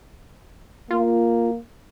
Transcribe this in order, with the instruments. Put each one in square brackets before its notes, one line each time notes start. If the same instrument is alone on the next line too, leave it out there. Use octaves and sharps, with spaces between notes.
[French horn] A#3 [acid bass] F4